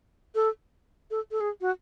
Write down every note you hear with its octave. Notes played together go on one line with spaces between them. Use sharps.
A4
A4
A4
G#4
F#4